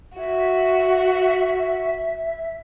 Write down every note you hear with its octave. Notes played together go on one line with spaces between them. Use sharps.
F#4 E5